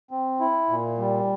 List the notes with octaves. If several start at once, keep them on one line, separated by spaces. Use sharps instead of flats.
C4
E4
A#2
G3